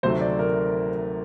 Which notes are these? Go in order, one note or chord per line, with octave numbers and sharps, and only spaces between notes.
D2 C3 D#3 F#3 A3 C5
D5
A#4